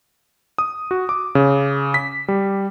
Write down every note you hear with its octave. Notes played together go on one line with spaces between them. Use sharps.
D#6
F#4
D6
C#3
B6
G3